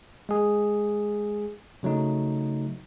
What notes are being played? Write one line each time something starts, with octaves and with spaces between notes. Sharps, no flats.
G#3 G#4
C#3 F#3 A3 D#4